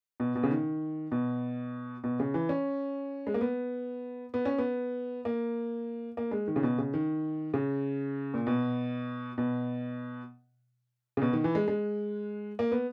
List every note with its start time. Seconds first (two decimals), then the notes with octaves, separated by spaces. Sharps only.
0.20 B2
0.35 B2
0.43 C#3
0.51 D#3
1.12 B2
2.04 B2
2.20 C#3
2.34 E3
2.49 C#4
3.27 G#3
3.34 A#3
3.41 B3
4.34 B3
4.45 C#4
4.58 B3
5.25 A#3
6.17 A#3
6.31 G#3
6.48 D#3
6.56 C#3
6.63 B2
6.78 C#3
6.94 D#3
7.54 C#3
8.34 A#2
8.47 B2
9.38 B2
11.17 C#3
11.22 B2
11.33 D#3
11.44 E3
11.55 G#3
11.68 G#3
12.59 A#3
12.72 B3